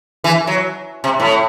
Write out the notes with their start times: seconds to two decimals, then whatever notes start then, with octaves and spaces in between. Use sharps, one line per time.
0.24 E3
0.47 F#3
1.04 C3
1.20 A2